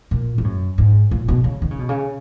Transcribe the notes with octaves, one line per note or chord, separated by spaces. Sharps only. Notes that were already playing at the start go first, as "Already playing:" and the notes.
A#2
G#2
F#2
G#2
A#2
B2
C#3
D#3
C#3
B2
C#3